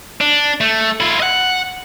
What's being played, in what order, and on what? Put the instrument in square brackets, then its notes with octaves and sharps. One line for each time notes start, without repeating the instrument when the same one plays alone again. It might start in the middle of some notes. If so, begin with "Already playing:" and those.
[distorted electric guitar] D4
A3
E4 F4
D#5 F#5